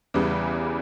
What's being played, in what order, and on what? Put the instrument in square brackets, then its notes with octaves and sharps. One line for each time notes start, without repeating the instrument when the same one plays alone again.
[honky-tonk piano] E2 C#3 E3 G3